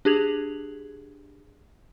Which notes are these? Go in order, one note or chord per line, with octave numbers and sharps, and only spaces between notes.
D4 G4 G#4 G#6 F7 F#7